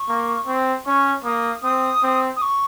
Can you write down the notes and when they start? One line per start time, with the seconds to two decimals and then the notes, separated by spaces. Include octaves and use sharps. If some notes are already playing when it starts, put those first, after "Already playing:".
Already playing: C#6
0.09 A#3
0.47 C4
0.86 C#4 C#6
1.24 A#3 D#6
1.63 C4 D#6
2.03 C4
2.36 D#6
2.42 C#6